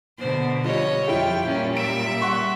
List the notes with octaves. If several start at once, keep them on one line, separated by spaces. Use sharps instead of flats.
B2 D3 C5
F3 G3 C#5 D#5
F2 E4 F4 G4 G5
A#2 G3 C#4
E5 D7
F#5 C6 C#6